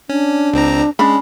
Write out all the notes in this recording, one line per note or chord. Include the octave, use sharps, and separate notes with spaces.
C#4 D4
C#2 C4 A#5
G#3 C#4 D4 B5